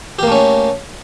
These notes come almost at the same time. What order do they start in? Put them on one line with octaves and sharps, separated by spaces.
G4 A#3 A3 C#4